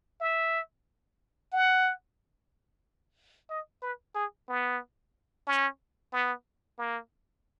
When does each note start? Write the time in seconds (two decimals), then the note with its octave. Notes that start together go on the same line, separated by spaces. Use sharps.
0.21 E5
1.53 F#5
3.50 D#5
3.82 B4
4.15 G#4
4.49 B3
5.47 C#4
6.13 B3
6.78 A#3